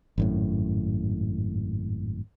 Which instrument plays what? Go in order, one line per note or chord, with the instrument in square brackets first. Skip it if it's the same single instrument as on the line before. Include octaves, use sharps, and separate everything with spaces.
[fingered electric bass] G#1 F#2 A2